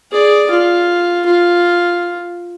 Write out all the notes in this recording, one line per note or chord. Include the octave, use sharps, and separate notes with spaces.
G#4 D5
F4
F4